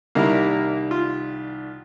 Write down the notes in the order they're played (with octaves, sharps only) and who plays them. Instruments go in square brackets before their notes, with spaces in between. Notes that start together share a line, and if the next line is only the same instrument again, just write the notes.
[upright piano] C2 D#3 G3 [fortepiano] A#3 E4 A#4
[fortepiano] F4